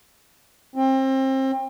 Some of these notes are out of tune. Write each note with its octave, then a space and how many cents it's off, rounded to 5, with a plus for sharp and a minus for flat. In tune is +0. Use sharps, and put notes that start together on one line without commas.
C4 +30